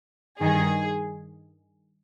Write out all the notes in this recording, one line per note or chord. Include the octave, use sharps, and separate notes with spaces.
G2 D#3 G#4